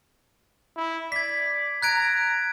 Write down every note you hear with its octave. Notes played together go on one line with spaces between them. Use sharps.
E4
D5 G#6 B6
A#5 F#6 G#6 D7